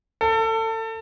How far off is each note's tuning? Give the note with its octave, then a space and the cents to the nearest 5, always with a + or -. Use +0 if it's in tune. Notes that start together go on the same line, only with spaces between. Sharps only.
A4 +30